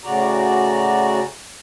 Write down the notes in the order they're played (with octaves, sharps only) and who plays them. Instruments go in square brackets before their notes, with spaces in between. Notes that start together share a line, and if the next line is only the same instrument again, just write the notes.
[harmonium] A2 C#3 F#4 D5 A#5